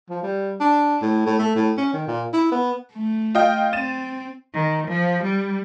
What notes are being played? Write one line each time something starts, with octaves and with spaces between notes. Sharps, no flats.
F3
G3
D4
A2
A2
A3
A2
C#4
D#3
A#2
E4
B3
A3
F4 D#5 G5
C4 A6 D#7 E7
D#3
F3
G3